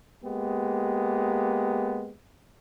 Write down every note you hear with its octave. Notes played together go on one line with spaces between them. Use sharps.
G#3 A#3 B3 G4